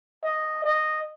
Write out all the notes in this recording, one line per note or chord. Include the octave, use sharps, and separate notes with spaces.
D#5
D#5